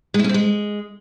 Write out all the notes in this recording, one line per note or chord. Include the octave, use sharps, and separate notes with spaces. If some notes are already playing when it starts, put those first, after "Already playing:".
G#3
E4
C#4
C4
G#3